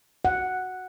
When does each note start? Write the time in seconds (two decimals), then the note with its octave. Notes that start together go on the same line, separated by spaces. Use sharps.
0.25 F#5